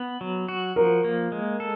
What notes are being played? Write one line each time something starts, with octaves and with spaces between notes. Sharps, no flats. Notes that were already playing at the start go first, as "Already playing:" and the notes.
Already playing: B3
F#3
F#4
F3 A#4
A#3
G#3
A4